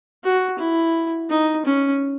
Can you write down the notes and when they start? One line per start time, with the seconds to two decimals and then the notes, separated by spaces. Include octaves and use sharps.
0.24 F#4
0.59 E4
1.30 D#4
1.65 C#4